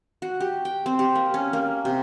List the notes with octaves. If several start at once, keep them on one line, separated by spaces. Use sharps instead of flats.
F#4
G4
G5
C4
G4
A#3
C#4
A#3
C3